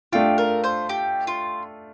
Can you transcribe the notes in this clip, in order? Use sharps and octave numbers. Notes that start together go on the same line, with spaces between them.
A3 D4 F4 G4
A#4
C5
G4
F4